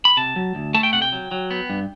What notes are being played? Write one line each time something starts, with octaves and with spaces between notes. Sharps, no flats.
B5
C3 A5
F#3
D2
A3 A5
G5
C3 F#5
G5
F#3
F#3
B3
G2